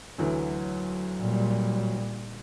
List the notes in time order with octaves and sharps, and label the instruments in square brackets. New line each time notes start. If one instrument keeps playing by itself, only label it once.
[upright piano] D2 E3 [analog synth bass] F#3
[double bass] A#2 G3